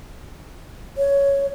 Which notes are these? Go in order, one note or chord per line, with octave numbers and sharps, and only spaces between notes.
C#5